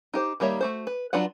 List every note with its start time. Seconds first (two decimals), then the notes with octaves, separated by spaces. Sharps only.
0.14 D#4 G4 C5
0.40 D#3 G3 A#3 C#5 E5
0.61 A3 F#4 C5
0.87 B4
1.13 F#3 D4 F4 B4 F#5